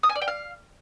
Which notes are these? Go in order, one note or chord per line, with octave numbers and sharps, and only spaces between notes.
D#6
G#5
D5
G5
F5